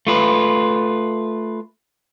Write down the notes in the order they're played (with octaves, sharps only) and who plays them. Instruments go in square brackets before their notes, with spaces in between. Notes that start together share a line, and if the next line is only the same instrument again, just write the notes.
[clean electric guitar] A3 F4 B4